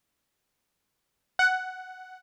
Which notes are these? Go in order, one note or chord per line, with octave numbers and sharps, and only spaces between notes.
F#5